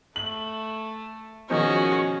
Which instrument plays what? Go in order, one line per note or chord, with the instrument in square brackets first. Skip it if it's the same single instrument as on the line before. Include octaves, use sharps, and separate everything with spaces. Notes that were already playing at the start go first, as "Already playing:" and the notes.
[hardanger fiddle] A3 [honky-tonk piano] F#7
[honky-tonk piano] B2 D#3 F3 [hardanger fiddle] C#4 [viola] F#4 G#4